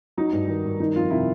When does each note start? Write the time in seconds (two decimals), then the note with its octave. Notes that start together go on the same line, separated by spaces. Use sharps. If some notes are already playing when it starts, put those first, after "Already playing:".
0.17 F#3 D#4
0.33 G2
0.48 D#3
0.65 G2
0.80 D#3 D#4
0.95 F2 F4
1.10 C3 E4